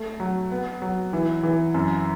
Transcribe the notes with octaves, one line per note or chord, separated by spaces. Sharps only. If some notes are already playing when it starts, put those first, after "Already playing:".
Already playing: A3
F#3
B3
F#3
E3
E3
F#2